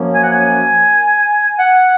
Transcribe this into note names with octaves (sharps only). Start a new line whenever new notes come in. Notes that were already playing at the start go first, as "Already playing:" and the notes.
Already playing: F#2 F3 A#3 C#4
G#5
F#5
G#5
F#5